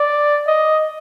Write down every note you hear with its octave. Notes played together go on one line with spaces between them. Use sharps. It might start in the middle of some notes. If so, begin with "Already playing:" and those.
Already playing: D5
D#5